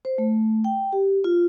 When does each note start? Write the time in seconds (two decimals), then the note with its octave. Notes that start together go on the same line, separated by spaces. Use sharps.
0.05 C5
0.18 A3
0.64 G5
0.92 G4
1.24 F4